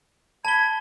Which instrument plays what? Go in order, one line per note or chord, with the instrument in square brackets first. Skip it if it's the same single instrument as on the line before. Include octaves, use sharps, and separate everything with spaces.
[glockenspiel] A5 G7 [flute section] B5 G#6